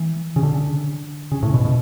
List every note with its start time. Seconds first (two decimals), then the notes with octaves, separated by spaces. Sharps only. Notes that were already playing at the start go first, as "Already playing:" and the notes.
Already playing: E3
0.36 C#3
0.43 D3
1.32 C#3
1.43 A2
1.54 B2
1.65 B2